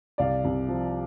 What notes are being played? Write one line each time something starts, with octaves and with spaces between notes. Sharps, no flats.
C2 D5 F5
C2
F3